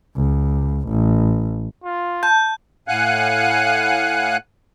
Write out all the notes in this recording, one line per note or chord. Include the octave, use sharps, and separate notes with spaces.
C#2
A1
F4
A5 G6
A2 F5 F#5 G#5 F#6